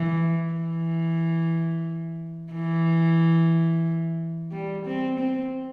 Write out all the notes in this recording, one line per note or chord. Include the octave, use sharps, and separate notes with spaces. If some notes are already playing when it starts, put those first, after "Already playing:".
Already playing: E3
E3
E3
G3
C4
C4